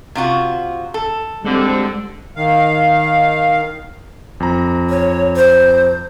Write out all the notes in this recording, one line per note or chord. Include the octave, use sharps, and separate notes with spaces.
C3 F4 F#4
A4
D3 G3 G#3 C4
D#3 F5
F2 A#5
C#5
C5